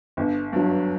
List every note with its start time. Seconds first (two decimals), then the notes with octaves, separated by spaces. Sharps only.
0.17 G1
0.53 G2 F#3